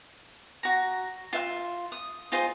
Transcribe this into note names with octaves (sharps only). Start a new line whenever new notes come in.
F#4 A#5
F4 E5 F#5 C6
D#6
D#4 F4 G#4 C5